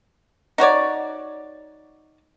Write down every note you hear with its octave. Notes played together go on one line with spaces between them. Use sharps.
D#4 F#4 C#5 D5